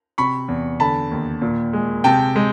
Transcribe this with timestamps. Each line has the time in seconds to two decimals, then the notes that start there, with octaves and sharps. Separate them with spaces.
0.18 C3 B5 C#6
0.48 E2
0.80 D3 A5 B5
1.12 D#2
1.42 A#2
1.73 G#3
2.04 C3 G5 A5
2.36 G#3